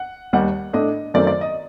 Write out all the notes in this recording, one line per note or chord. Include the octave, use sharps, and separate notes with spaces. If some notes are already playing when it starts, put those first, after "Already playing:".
Already playing: F#5
D#2 D#3 G3 F#5
A2 A3 D4 D#5
F#2 D#3 F#3 A3 C4 D5
D5
D#5